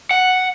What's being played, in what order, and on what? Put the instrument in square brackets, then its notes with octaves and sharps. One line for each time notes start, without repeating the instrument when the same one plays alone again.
[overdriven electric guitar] F#5